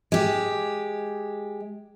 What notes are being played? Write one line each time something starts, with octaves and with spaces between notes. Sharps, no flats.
G#3 G4